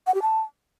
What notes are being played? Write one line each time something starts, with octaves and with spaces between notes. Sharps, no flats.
F#5
G4
A5